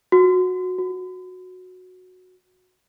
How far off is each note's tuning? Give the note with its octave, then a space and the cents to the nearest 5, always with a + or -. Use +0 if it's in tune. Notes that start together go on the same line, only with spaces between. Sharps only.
F#4 -15
F#4 -10